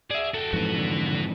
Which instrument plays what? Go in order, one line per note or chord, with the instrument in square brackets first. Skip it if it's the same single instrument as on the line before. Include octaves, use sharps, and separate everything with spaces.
[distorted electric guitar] G#4 [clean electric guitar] D5 E5
[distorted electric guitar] F#4 G5 [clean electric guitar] A4
[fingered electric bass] F2 G#2 E3 [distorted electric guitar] F#4 B4
[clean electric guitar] D3